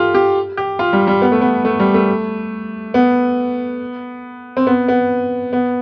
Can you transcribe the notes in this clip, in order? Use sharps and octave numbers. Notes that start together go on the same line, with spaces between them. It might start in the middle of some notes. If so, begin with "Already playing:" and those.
Already playing: F4 G4 A4
G4
G4
F4
G3
G3
B3
A3
B3
A3
G3
A3
B3
C4
B3
B3
B3